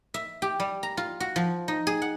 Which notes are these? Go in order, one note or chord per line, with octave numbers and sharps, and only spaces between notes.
E5
G4
G3
A#5
F4
F#4
F3
D#4
G#4
F#5